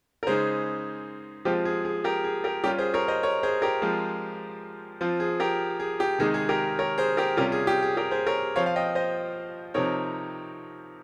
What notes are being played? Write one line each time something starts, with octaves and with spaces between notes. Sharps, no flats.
A#4
C#3 G#3 D#4 G#4 C5
F3 G#3 C4 F4 G4
G#4
G#4
G4 A#4
G#4
G4 A#4
G3 C#4 F4 G4 A#4
G#4 C5
A#4 C#5
C5 D#5
A#4 C#5
G#4 C5
G4 A#4
F3 G#3 C4 F4
F3 C4 F4
G#4
G4 A#4
G#4
G4
C3 D#3 G#3 D#4 G#4
G#4
G4 A#4
A#4 C#5
G#4 C5
G4 A#4
C3 G3 C#4 F4 G4 A#4
G#4
G4
G#4
G4 A#4
G#4 C5
A#4 C#5
F3 C4 F4 C#5 F5
F5
D#5 G5
C5 D#5
C3 F3 C4 D#4 A#4 C#5